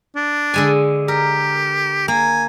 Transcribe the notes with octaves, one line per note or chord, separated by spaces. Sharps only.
D4
D3 G#3 G#5
G4 A#4
A#3 G#5